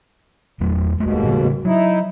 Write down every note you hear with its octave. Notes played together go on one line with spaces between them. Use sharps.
E2 F#3 A3
D#1 D#2 G#2 B2 G#3 A3
A2 C#3 G3
F#3 D#4 E4